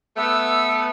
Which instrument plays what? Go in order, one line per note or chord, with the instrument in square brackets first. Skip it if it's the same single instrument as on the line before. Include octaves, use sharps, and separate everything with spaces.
[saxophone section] A3 B3 [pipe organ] E6